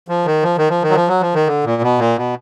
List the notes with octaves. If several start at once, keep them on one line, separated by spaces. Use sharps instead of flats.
F3
D#3
F3
D#3
F3
D#3
F#3
F3
F#3
F3
D#3
D3
A#2
B2
A#2
B2